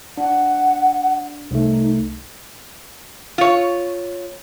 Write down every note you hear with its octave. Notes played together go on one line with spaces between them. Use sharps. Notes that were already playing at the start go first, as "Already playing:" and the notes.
D4 F#5
C2 A3 D#4
F4 C#5